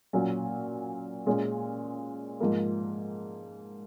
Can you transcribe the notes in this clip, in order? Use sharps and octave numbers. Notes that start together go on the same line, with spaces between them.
A#2 F#3 C#4
A#2 G#3 C#4
G#2 F3 A#3